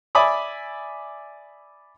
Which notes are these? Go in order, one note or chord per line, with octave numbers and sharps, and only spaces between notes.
D5 E5 G#5 B5 D6 D#6